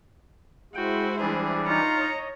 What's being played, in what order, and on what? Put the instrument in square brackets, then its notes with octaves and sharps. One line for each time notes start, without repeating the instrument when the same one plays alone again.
[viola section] G#3 E4 C5 [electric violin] F#4 [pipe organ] G5
[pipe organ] E3 G3 D4 [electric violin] G#4
[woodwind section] D#4 F4 [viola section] C#5 [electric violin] A#5 C#7
[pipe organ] D#5